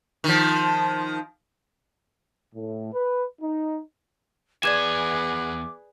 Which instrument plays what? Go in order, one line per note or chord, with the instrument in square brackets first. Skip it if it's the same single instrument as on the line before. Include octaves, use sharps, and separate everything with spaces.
[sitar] D#3 F3
[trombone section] A2
B4
D#4
[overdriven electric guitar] E2 G#5 [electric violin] G#4 B4 [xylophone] D5 G#6 E7 [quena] D6